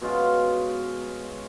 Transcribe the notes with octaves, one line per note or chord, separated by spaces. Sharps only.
B2 G#3 C#4 F4